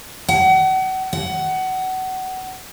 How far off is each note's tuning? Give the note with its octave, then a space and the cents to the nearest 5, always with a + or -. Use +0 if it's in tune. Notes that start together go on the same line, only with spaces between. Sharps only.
F#5 +35
F#5 +25